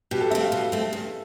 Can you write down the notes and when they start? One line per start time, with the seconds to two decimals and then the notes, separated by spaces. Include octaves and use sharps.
0.11 B2 G4
0.21 A4
0.30 A3 C4 E5
0.41 F5
0.52 B2
0.72 A3 C4
0.93 E2